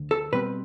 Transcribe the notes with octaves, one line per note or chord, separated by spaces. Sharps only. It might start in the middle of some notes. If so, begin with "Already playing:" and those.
Already playing: D2 D3
A4
B2 G3 C4 B4